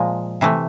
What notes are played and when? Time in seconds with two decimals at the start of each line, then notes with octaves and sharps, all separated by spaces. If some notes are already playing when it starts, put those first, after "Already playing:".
Already playing: A#2 F3 G#3
0.41 C3 E3 A3